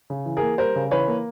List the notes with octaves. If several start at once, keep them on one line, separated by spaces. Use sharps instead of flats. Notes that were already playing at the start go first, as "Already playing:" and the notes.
C#3
E3
G#4 A#4
A#3
G3 A#4 C5
C#3
E3 B4 C#5
A#3